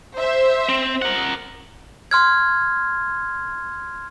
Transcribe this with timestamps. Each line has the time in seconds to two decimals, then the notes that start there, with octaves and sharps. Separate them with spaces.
0.18 C5 E5
0.69 C4
1.02 A#4 F#5
2.11 C6 F6 G#6